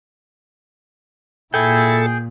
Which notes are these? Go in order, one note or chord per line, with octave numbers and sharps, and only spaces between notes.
A#2 E4 G#4 A4 G5